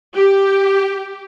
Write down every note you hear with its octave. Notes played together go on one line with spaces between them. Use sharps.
G4